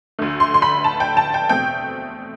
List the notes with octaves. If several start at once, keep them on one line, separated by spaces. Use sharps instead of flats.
D2 D3 A3
C6
C6
B5
A5
G5
A5
G5
E2 B2 A3 C4 G5